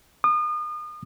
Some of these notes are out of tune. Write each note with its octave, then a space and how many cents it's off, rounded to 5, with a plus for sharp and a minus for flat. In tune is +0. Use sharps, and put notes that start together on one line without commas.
D#6 -35